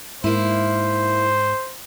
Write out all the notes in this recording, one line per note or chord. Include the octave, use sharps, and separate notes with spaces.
G#2 A#3 E4 C5